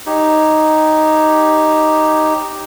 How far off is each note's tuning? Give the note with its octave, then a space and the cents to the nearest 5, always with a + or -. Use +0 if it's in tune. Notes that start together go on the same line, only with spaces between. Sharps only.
D#4 +0 G4 +0 C#5 -15